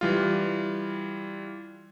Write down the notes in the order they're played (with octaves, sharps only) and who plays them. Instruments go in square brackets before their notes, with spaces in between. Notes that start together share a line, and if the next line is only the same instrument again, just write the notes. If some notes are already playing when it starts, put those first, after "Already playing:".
[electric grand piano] E3 G3 F4